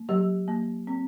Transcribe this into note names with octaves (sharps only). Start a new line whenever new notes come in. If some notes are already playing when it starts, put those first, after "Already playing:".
Already playing: A#3
F#3 G4
A#3
C4